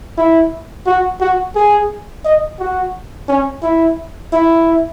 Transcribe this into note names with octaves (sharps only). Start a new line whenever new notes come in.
E4
F#4
F#4
G#4
D#5
F#4
C#4
E4
E4